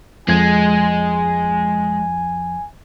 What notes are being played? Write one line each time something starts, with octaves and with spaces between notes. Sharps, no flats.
F2 F3 G#3 G#5 G#6